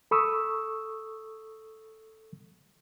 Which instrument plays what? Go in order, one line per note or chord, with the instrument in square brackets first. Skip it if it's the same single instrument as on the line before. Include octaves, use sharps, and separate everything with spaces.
[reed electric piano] A4 B5 C#6 D#6 E6